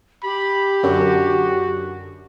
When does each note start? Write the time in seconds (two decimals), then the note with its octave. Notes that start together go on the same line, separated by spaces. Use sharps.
0.23 G4 B5
0.83 F#2 D3 F#4